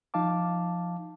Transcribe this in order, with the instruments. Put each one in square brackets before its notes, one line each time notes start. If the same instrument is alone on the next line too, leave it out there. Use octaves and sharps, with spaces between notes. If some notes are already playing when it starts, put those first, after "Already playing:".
[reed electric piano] F3 D#4 F5 A5 D6